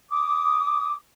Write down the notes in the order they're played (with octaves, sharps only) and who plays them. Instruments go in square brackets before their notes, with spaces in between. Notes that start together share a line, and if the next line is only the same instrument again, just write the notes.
[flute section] D6 D#6